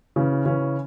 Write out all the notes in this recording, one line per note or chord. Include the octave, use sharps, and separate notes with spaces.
C#3 E3 C#4
C#3 E3 C#4